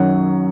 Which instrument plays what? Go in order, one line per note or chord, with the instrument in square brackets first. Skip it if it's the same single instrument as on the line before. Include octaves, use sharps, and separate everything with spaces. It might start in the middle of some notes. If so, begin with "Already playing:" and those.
Already playing: [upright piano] F#2 D#3 F#3 F#5